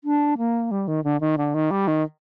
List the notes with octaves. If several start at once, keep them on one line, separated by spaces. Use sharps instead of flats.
D4
A#3
G3
D#3
D3
D#3
D3
D#3
G3
D#3